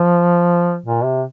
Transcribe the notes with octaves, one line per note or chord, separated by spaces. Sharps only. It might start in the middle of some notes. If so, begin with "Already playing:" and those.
Already playing: F3
A#2
C3